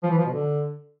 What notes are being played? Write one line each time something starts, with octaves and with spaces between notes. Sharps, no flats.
F3
E3
F3
B2
D3